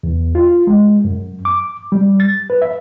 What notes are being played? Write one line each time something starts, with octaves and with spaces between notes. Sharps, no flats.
E2
F4
G#3
F#2
D6
G3
A6
B4
E5